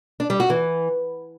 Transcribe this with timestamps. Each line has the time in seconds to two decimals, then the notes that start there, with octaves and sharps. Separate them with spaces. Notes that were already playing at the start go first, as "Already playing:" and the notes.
0.20 D4
0.30 G3
0.40 F#4
0.50 E3